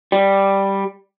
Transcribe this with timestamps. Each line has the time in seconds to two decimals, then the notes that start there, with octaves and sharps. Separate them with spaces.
0.12 G3